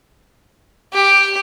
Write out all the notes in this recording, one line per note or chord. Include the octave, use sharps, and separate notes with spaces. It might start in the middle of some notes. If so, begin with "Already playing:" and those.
G4